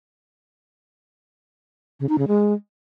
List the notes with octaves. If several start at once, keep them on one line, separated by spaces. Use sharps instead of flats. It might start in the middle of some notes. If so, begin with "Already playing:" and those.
C#3
D#4
C#3
G#3